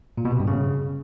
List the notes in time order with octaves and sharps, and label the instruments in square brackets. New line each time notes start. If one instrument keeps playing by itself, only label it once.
[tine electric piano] A#2
B2
C3
G2
C#3